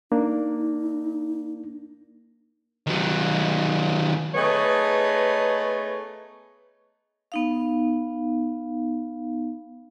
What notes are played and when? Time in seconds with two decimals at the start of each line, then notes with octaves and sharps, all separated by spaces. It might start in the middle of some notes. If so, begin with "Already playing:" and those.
0.12 A#3 D4 D#4
2.87 D#3 F#3
4.35 A3 B3 D#4 G#4 B4 C#5
7.32 B3 D#4 F5